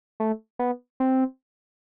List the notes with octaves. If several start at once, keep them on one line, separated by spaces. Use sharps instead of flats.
A3
B3
C4